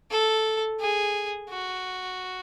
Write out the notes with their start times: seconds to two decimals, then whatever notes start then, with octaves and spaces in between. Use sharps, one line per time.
0.11 A4
0.80 G#4
1.50 F#4